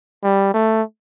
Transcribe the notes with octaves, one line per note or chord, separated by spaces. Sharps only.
G3
A3